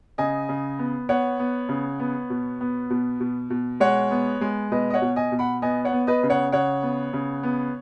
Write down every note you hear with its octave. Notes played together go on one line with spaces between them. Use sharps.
C#3 D#5 G#5
C#3
B3
B3 C#5 F#5
B3
C#3
B3
B2
B3
B2
B2
B2
G#3 C#5 F#5
B3
G#3
B2 B4 D#5
D#5
C#5 F#5
B2
D#5 G#5
B2
F#5 B5
B3 D#5 G#5
C#5 F#5
B3
B4 D#5
C#3
C#5 F#5
C#3 C#5 F#5
B3
C#3
B3